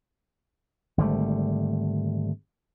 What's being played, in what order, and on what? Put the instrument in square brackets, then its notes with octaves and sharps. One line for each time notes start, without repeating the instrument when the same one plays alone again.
[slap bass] G#1 D3 G3 A3